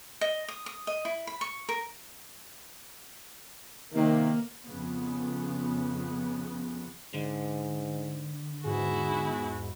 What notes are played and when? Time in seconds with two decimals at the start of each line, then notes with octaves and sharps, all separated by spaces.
0.21 D#5
0.48 D#6
0.66 D#6
0.87 D#5
1.05 E4
1.27 B5
1.41 C#6
1.69 A#4
3.94 C3 D#3 A#3
4.63 F2 C#3 B3
7.14 G#2 D3
8.65 E2 G#2 E4 F#4 G#4